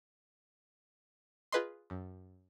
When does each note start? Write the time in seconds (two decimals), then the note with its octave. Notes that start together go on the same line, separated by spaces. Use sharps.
1.52 F4 G#4 B4 D#5 C6
1.90 F#2